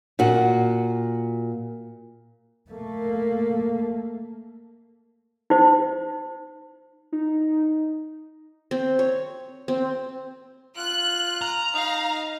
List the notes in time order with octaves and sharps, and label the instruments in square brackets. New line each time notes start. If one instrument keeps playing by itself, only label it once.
[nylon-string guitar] A#2 F#4
[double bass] A3 A#3
[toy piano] D#4 C5
[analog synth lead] D#4
[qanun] C4
C#5
C4
[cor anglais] F4 [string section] F#6
[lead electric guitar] A#5
[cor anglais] D#4 [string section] F5